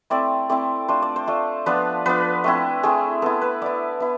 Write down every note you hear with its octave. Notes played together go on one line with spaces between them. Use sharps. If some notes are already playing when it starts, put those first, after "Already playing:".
A3 C4 E4 D5
A3 C4 E4 D5
A3 D4 F4 C5
D5
C5
A3 D4 F4
F3 B3 D4 F4 B4
F3 B3 D4 F4 B4
A3 C4 E4
A3 C4 E4 G#4
B3 E4 A4
B4
B3 E4 D5
B3 E4